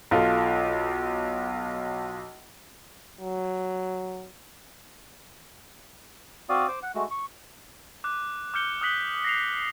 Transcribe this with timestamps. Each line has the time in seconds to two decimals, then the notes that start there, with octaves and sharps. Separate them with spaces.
0.11 B1 F4 A4
3.21 F#3
6.49 C4 F#4 D5 F5 D#6
6.68 C5 D6
6.83 F#5
6.95 G#3 A3 F#4
7.11 C#6
8.04 D6 F#6
8.54 D6 F6 G6 C#7 G7
8.81 D#6 F6 F#6 B6 F#7 G7
9.25 A#6 C7 F7